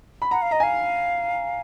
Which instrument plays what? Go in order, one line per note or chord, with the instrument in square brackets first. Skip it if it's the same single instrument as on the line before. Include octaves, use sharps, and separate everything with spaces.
[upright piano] B5
[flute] F#5 [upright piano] A#5
[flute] F5
[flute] D#5 [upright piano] A#5
[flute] F5 [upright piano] G#5